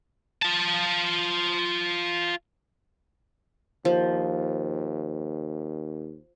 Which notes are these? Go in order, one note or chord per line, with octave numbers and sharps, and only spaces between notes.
F4 A5
D#2 F3